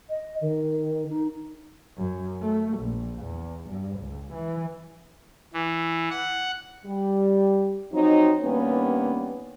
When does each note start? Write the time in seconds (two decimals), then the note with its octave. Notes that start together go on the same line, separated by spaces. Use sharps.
0.09 D#5
0.41 D#3
1.09 D#4
1.97 F#2
2.42 A3
2.79 A#1
3.22 E2
3.69 G2
3.99 C#2
4.34 E3
5.54 E3
6.10 F#5
6.85 G3
7.92 F3 F#3 C4 D#4
8.42 G2 D#3 A#3 B3 C#4 B4